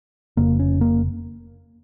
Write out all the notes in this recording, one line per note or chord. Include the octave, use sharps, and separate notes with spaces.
F1 F2 C#3 A#3
C#4
A#3